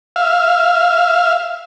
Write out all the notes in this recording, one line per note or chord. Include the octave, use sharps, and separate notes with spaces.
E5 F5